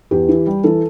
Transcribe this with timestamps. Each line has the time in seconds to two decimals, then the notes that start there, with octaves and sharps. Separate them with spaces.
0.11 E2 G4
0.29 E3
0.47 G3
0.64 E3 A4